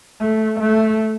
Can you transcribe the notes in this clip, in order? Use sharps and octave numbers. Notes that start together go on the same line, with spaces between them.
A3
A3